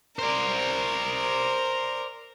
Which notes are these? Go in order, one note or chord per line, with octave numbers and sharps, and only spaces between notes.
A#4 C5 D5